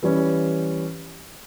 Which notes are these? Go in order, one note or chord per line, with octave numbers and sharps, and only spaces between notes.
E3 G3 C#4